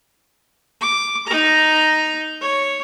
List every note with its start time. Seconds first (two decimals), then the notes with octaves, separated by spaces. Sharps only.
0.81 D6
1.27 D#4 A#5
2.41 C#5